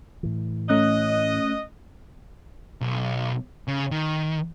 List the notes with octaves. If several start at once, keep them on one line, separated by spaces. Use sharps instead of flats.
A2 E3
A3 C#4 D#5 F#6
B1
C#3
D#3